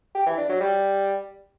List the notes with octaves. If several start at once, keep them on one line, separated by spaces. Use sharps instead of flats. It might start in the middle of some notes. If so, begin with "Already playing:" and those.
G4
E3
D4
F#3
G3